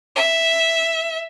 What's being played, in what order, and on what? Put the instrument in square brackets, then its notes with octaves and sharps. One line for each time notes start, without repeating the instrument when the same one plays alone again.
[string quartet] E5